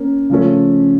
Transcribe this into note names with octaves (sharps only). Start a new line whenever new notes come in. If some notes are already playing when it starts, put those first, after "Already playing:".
Already playing: A#3 C#4
C#3 F3 A3 C#4